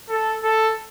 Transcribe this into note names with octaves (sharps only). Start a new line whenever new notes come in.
A4
A4